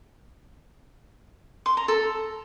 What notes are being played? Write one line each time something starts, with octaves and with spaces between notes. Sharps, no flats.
C6
A#5
A4